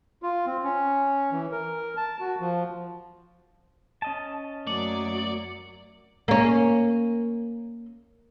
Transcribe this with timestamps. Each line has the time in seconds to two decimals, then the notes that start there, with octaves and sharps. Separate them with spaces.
0.23 F4
0.46 C4
0.64 C#4
1.32 E3
1.52 A#4
1.97 A5
2.20 F#4
2.40 F3
4.02 C#4 D#5 A5
4.67 F#2 F#3 A3 A#3 D5 C#7
6.28 A#3 C#4